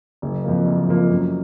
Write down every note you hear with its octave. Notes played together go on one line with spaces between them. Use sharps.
F#1
F2 F3 A#3
F#1
F2 F3 A#3
F#2